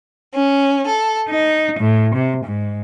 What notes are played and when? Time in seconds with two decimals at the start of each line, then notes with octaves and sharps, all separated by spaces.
0.34 C#4
0.85 A4
1.28 D#4
1.79 A2
2.15 C3
2.45 G#2